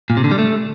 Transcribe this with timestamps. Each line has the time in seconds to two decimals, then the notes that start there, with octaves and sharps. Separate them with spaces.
0.10 A#2
0.17 C3
0.24 D3
0.31 G3
0.39 A3